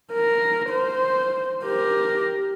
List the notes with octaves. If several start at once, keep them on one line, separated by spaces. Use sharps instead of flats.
A#4
C5
G4 A#4